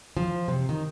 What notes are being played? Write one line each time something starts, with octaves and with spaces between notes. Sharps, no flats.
F3
C3
D#3